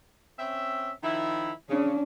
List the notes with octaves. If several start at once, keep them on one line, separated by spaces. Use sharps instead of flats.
C4 C#4 E5
D#3 F3 E4
C#3 C#4 D4